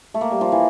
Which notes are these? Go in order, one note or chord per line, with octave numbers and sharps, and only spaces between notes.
A3
A#3
G3
F3
E3